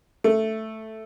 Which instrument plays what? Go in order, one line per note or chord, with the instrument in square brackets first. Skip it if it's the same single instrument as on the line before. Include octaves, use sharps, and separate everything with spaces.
[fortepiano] A3